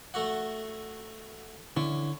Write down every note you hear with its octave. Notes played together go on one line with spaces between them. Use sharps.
A3 F#4 F#5
D3 C#4 E4